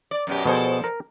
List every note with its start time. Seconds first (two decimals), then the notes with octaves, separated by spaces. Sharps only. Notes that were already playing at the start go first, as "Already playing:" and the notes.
0.11 D5
0.27 F#2 B2 G4
0.45 B2 F3 G#4 A4 C5
0.84 A#4